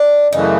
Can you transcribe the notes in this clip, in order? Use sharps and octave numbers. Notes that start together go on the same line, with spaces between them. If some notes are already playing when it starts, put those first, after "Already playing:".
Already playing: D4
F#2 C#3 E3 A3 D#4